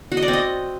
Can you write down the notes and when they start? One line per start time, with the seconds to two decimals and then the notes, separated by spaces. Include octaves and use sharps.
0.12 F#4
0.17 D#5
0.22 D5
0.28 C4
0.33 D#5